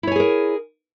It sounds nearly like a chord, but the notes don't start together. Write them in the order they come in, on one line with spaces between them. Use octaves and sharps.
E4 C#5 G#5 G#4 A#4